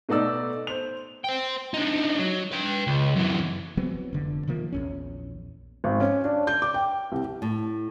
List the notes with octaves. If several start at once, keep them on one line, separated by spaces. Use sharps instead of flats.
B2 A3 D#4 D5 E6
C5 F7
C5 G5
D4 D#4
F#3
B4 G5
C#2
F#2 E3
E3 F#3 B3 C4
F1 D3
C3 D#3 F3 A#3
A#1 E2 C#4
G#1
C#4
D4
G6
D6
G5
C2
A2